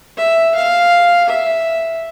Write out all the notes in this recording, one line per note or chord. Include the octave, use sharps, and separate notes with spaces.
E5
F5
E5